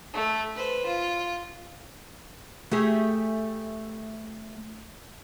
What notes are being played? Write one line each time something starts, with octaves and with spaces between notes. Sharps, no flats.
A3
B4 C5
F4
A3 G4 G#4